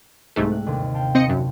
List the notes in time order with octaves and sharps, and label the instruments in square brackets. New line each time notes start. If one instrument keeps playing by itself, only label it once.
[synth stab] C2 G#2 A3
[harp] G3 F#6
G1 D#2 C3
F5 G5 A5
[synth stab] C4 D#5 C#7
F#2